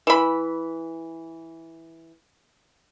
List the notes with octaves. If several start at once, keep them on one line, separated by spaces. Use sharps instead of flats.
E3 B5